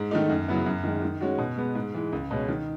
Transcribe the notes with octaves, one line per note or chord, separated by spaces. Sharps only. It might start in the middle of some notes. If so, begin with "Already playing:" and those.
Already playing: G#2
D#3 A3 D#4
F#2
C#3 F#3 B3 E4
F#2
D#3 G#3
D#3
G#3 C#4 F#4
B2
G#3 B3
G#2
E3 G#3
C#2
B2 G#3 C#4
D#3